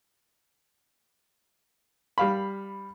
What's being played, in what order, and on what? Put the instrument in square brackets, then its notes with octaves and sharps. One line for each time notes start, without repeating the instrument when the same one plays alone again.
[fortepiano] G3 F5 B5